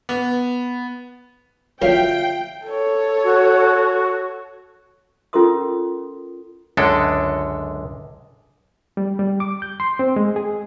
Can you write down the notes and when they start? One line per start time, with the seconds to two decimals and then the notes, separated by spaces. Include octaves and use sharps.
0.09 B3
1.82 F#2 A2 D3 F4 E5 F5 G5
2.67 A4 C#5
3.24 F#4
5.33 C#4 F4 A4 A#4 C6 D#6
6.77 C#2 F#2 D3 G#3 D4 A4
8.97 G3
9.19 G3
9.40 D6
9.62 G6
9.80 C6
9.99 C4
10.16 G#3
10.36 G#4